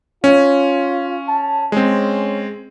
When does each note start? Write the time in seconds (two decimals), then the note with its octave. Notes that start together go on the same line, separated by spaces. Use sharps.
0.24 C#4 F4
1.28 A5
1.72 G#3 C4 C#4